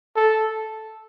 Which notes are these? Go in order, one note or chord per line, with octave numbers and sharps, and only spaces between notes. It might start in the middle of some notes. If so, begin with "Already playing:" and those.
A4